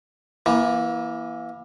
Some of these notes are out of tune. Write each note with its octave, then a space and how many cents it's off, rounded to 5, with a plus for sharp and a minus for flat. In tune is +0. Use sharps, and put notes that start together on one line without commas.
E3 +0 A#3 +30